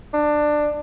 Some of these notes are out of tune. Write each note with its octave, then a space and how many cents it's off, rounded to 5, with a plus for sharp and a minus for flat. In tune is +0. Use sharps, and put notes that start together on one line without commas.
D4 +15